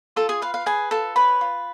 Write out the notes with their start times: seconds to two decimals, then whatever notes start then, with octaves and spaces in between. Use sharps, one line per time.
0.16 F4 A4 A5
0.29 G#4 G#5
0.42 B4 F5
0.54 F5
0.66 G#4 B4 G#5
0.91 F4 A4 A5
1.16 B4 C#5 B5
1.41 F4